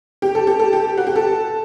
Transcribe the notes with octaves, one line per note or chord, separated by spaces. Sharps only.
G4
A4
G4
A4
G4
F#4
G4
A4